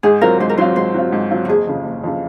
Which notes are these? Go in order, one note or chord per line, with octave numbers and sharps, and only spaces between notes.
G#2 G#4
F#3 C4 F4 A#4
G#2 C5
A#4
F#3 C4 F4 C5
G#2 C5
F#3 C4 F4
G#2
F#3 C4 F4
F#4
F#1 G#4
F2 C#3
F#1
F2 C#3